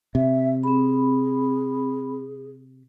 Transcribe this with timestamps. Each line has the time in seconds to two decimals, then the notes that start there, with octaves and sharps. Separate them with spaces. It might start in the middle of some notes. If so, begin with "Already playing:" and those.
0.15 C3 E5
0.63 C4 G#4 B5